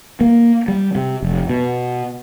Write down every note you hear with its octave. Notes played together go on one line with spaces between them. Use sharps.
A#3
G3
C3
F1
B2